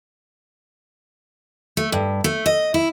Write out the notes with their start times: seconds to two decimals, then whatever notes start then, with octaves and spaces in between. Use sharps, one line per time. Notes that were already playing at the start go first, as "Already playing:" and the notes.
1.77 A3
1.92 G2
2.24 A3
2.46 D#5
2.74 E4